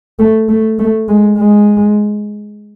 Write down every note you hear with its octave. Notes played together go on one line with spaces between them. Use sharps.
A3
A3
A3
G#3
G#3